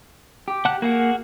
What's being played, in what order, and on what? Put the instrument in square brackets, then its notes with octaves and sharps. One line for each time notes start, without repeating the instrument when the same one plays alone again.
[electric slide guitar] G4
[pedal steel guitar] F#5 A5 F#6
[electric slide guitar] A#3 [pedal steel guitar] F#4 G#4 F#5